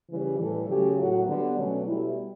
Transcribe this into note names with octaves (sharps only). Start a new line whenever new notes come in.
C#3 E3 G3
A2 E3 G3 A4
C#3 F#3 A3 G4
A2 F#3 A3 F#4
D3 G3 B3
B2 F#3 A3 C#4
B2 G3 E4